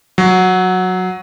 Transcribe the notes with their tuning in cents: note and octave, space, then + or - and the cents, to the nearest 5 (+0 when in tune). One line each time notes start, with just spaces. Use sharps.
F#3 -10